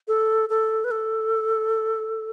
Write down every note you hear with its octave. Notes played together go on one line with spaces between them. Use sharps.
A4
A4
B4
A4